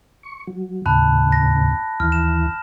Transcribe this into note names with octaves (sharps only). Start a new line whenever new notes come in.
C#6
F#3
D#2 A2 C#3 A5 B5 F#6
A#6
D#2 E3 F6
E7